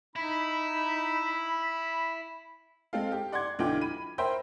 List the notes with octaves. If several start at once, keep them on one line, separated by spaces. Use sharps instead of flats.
D#4 E4 B5
G#3 C4 A4 F5
G4
D5 F#5 C6 D6 G#6
B1 D3 E3 F4 G5 D6
B5 D#7
A#4 C5 E5 G5 B5 C6